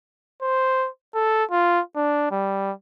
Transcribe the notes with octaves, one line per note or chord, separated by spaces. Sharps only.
C5
A4
F4
D4
G3